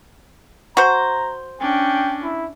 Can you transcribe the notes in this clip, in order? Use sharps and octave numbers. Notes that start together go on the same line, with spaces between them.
F#4 C5 A#5
C#4 D4 G5
E4